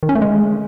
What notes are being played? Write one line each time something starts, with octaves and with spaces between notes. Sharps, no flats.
D#3
C#4
A3
G#3